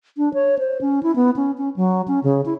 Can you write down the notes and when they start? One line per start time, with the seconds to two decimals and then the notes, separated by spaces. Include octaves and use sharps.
0.17 D4
0.34 C#5
0.59 C5
0.81 C#4
1.03 E4
1.16 B3
1.36 C#4
1.58 C#4
1.76 F#3
2.08 C#4
2.24 C#3
2.46 E4